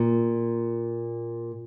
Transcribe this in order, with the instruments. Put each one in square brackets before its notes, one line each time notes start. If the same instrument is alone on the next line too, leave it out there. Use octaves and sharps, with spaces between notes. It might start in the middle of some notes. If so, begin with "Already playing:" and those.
Already playing: [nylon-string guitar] A#2